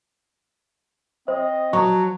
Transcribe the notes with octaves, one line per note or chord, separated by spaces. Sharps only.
C4 C5 D#5
F3 F#3 C#6